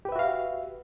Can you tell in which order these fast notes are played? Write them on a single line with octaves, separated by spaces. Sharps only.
G4 B4 E5 F#4 F5